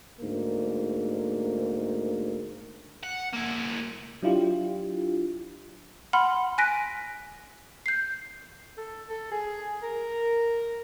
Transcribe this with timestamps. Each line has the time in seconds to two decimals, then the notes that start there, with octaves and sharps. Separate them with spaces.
0.20 D2 G#2 A#3
3.03 F#5
3.34 A#3 E4
4.22 F#3 D4 E4 F4 G4
6.13 F#5 B5 C6 F6
6.58 G#5 F#6 A#6 B6 D7
7.86 G6 C7
8.77 A4
9.09 A4
9.32 G#4
9.83 A#4